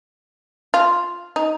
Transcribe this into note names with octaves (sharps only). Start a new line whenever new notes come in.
F4
D#4